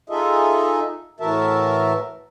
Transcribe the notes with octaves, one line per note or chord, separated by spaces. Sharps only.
D#4 F4 G#4 A4 D#5 E5
A2 E3 F#4 A#4 E5 A5